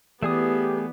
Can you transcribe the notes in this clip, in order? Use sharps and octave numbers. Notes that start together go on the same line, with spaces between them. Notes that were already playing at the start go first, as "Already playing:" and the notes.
E3 A3 B3 G4 G#4 D5 D#6